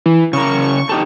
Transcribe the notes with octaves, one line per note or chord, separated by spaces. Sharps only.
E3
C#3 A#4 C#6
D#4 G4 A4